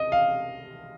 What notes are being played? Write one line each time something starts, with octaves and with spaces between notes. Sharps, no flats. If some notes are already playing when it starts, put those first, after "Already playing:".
Already playing: D#5
F5